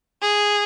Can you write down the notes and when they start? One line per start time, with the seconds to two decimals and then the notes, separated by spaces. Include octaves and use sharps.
0.22 G#4